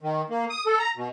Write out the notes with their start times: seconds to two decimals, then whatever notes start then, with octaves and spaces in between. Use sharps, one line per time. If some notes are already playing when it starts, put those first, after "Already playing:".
0.01 D#3
0.30 A#3
0.50 D#6
0.66 A4
0.79 A#5
0.97 B2